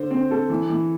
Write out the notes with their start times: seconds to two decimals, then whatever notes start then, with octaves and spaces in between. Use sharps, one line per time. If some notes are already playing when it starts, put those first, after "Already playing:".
Already playing: D3 C5
0.11 C4
0.31 A4
0.50 E3
0.70 E3